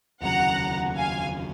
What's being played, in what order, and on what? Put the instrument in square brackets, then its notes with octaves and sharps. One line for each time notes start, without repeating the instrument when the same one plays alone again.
[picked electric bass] F1 D#2 C#3 F#3 [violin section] F#5 A#5
[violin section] F5 G#5